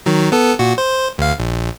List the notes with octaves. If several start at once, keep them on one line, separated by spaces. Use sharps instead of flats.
D#3 F#3
B3 A4
A#2 F#4
C5
D2 F5
A#1